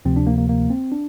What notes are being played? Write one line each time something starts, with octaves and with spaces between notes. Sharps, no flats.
D2 C3 F3 C4
D4
A#3
A#3
A#3
C4
D4